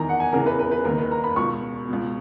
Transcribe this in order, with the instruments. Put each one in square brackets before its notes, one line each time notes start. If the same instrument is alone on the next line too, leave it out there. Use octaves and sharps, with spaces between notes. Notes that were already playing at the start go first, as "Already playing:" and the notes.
Already playing: [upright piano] E2 D#3 A#5
F#5
G#5
E2 C#3 E3 A#4
B4
B4
B4
D#2 D#3 A#4
B4
A#5
B5
C#2 B2 C#6
C#2 B2